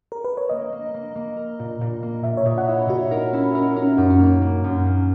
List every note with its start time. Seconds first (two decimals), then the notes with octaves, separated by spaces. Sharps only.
0.12 A#4
0.24 B4
0.37 C#5
0.49 A#3 D#5
0.72 A#3
0.94 A#3
1.15 A#3
1.36 A#4
1.59 A#2
1.81 A#2
2.03 A#3
2.24 A#2 E5
2.37 C#5
2.45 A#2 D#5
2.58 F#5
2.68 E4 E5
2.89 A#2 F#4
3.11 D#4 A#4
3.33 C#4 E4
3.55 C#4 A#4
3.76 C#4 A#4
3.98 F#2 D#4
4.10 C#4
4.19 A#3 D#4
4.42 A#3
4.64 F#2
4.85 A#3